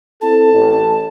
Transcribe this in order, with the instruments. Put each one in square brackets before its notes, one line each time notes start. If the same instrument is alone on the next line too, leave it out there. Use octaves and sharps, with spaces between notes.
[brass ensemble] C4 E4 A4 [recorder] A5
[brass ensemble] A1